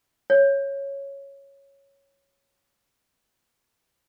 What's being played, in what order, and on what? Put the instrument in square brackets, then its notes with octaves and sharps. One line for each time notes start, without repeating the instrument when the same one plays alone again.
[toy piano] C#5